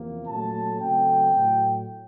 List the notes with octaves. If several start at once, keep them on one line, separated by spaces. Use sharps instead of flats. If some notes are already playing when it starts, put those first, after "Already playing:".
Already playing: E2 C3 F3 A#3
A#2 F#3 A3 C#4 A5
C#3 F#3 A3 C4 G5
A2 F#3 A3